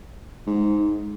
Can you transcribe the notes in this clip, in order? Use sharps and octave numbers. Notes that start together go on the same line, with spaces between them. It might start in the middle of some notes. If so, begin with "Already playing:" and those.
G#2